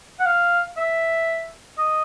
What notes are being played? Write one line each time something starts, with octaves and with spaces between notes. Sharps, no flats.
F#5
F5
E5
D#5